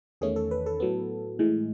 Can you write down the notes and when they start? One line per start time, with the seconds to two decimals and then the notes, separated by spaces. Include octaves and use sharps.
0.21 E2 D#3 A3 C#4 G#4
0.36 A4
0.51 B4
0.66 A4
0.80 A2 F#3 B3
1.39 A2 E3 G#3